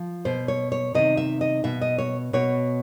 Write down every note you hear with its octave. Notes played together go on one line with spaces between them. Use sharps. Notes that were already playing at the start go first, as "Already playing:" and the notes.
Already playing: F3
B2 C5
C#5
C#5
C3 D#3 D#5
E5
D#5
B2 E5
D#5
C#5
B2 C#5